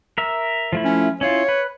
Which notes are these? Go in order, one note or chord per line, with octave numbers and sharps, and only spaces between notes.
A#4 E5
F3 A3 E4
C#4
C#4 E4 F4 C#5
B4